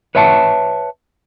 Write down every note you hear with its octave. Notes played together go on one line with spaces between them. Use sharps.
B4 C#5 E5 F#5 A5